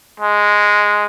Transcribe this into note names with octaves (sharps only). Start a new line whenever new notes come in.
G#3